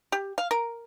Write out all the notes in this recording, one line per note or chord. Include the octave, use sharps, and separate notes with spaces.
G4
F5
A#4